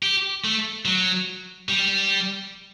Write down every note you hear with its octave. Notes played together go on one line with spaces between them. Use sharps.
G4
A3
F#3
G3